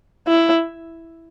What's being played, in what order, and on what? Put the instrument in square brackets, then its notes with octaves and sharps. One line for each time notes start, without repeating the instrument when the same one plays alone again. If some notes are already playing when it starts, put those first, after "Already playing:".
[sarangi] E4